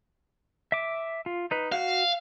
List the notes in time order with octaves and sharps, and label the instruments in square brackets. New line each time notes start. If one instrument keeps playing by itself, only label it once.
[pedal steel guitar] E5 D6
F4
D#4 B4
[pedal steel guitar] F#4 [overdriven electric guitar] F5